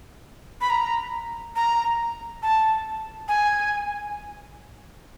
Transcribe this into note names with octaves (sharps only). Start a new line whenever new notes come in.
B5
A#5
A#5
A5
G#5